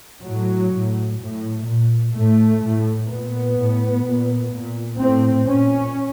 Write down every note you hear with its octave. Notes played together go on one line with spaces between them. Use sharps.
A2 F#3
A2
A2
A#2
A2 A3
A2
A#2 B3
A2
A#2
A#2
A2 C4
A#2 C#4